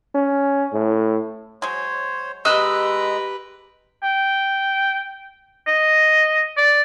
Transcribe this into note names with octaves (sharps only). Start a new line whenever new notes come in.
C#4
A2
F#3 G#3 C5 C#5
G#3 G4 B4 D#5 A#5 E6 F#6
G5
D#5
D5